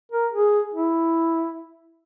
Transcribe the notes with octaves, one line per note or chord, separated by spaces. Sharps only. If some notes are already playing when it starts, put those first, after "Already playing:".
A#4
G#4
E4